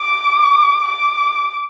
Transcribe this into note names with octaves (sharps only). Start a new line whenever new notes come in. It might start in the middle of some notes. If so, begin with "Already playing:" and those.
Already playing: D6
D6